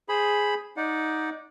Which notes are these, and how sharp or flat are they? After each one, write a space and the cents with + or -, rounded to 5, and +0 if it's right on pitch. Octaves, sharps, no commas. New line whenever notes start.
G#4 +0 C5 +0 B5 +0
D#4 +10 D5 +0 F#5 -25